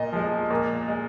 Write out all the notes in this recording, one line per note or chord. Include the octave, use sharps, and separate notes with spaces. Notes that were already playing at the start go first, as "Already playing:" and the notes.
Already playing: A#2 D#5
F3 G#3
A#2
G#3